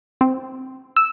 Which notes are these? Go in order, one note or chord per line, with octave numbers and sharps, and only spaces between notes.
C4
E6